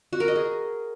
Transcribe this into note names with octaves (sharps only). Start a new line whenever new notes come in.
F#4
A#4
D#5
G#4